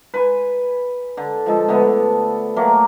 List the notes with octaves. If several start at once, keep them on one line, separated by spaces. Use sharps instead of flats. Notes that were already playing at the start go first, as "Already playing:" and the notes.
B4 G#5 C6
D3
F3 G#3 A4
D3 A3 B3
F#3 A3 A#3